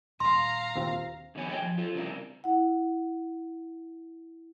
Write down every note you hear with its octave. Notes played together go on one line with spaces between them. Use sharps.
D#1 F5 A#5 C6
D#2 C4 F4
F2 D#3 F#3 B3 C#5 G#5
A#2 G#4 C#5 D#5 G5
F3
F4 A4 C5
C#3 E3 G3 C4 A#4
E4 F#5